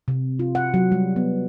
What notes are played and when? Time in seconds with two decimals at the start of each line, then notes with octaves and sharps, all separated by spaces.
0.08 C3
0.39 F4
0.55 F#5
0.74 F#3
0.92 G3
1.16 B3